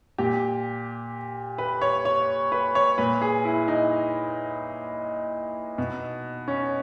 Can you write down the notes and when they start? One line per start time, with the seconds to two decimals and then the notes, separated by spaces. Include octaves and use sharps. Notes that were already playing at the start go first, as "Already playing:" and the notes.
0.18 A#2 G4
1.58 B4
1.82 C#5
2.05 C#5
2.52 B4
2.75 C#5
2.98 A#2 B4
3.21 G#4
3.45 E4
3.68 D#4
5.78 B2
6.48 C#4